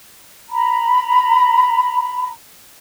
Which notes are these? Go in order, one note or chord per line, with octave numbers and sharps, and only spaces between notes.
A#5 B5